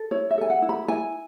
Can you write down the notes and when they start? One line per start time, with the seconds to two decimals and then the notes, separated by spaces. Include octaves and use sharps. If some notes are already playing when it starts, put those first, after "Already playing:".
Already playing: A4
0.11 E4 C#5
0.31 E5
0.38 A4 G#5
0.50 F#5
0.62 E4
0.69 B5
0.88 E4 G#5